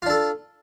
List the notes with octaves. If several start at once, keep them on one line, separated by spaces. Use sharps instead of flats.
D4 F4 A4